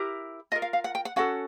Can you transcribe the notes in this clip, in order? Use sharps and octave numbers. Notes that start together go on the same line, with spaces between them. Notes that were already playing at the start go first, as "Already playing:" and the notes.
Already playing: E4 G4 A#4
F4 A#4 D#5
F5
F5
F#5
G5
F#5
C#4 F#4 A4 F#5